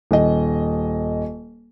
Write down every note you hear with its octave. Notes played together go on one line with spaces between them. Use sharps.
D#1 D#5